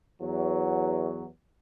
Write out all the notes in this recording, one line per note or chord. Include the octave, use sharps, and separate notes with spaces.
E2 F#3